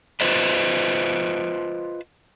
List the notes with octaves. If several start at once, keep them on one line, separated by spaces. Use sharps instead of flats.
F4 B4 C5 D#5